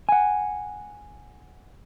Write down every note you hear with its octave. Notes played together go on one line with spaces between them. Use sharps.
F#5 G#5